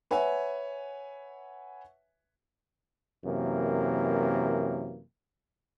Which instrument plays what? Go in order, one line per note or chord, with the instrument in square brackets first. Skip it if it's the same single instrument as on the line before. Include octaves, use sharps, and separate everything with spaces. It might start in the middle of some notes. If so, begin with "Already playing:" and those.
[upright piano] B4 C#5 E5 F#5 G#5
[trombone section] F#2 C3 E3 A#3